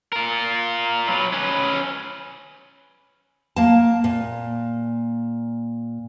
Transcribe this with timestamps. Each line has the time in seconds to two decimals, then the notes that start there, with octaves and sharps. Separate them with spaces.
0.12 F4 A#4
1.08 F#3 B4
1.33 C#4 B4
3.56 A#3 A5
4.04 A#2